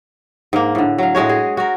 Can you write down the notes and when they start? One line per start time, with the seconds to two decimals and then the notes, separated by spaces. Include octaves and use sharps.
0.53 G#2 A#3
0.75 A2 D3
0.98 F#3 F5
1.15 A2 G#3 F#4 C#5
1.29 G#4
1.57 F#4 A#4